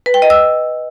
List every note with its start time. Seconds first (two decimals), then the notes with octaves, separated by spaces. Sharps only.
0.06 B4
0.14 G5
0.22 D#5
0.30 E6